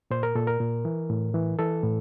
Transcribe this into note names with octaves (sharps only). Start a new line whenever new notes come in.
A#2 C5
A#4
A#2 A4
A#4
A#2
E3
A2
E3
E3 A4
A2